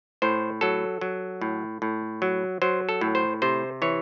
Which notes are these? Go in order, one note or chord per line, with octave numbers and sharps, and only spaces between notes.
A2 C5
F#3 A4
F#3
A2
A2
F#3
F#3 C5
A4
A2
C5
C3 C5
E3 C#5